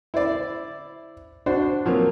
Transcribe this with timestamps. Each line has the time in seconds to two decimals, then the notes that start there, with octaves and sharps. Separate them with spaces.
0.14 E4 C5 D5
1.46 D4 F#4 C5
1.86 F3 F#3 A#3